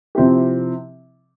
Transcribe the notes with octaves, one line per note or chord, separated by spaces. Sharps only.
C3 F3 C4 E4 G4